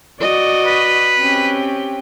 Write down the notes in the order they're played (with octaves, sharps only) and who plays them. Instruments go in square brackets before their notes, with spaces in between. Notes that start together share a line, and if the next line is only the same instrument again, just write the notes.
[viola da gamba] F#4 D5 D#5
[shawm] B4
[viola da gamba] C4 C#4 G4